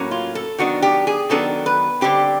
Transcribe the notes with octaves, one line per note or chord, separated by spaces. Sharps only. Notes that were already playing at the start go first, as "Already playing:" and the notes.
Already playing: A2 F#3 A#3 C#4
F4
A4
D#3 F#3 B3 D4 F#4
G4
G#4
D#3 F#3 B3 D4 A4
B4
D3 G3 C4 G4